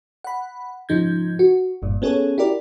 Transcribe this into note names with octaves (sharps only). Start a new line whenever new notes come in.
F#5 B5
G#2 C#3 F3 D#4 G6 G#6
F#4
G1 G2 A#2
B3 C#4 G#4 A4 C#5
E4 F#4 G4 A#4 D5